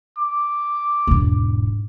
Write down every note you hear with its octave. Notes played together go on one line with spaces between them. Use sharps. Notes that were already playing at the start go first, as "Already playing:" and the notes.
D6
E1 G#2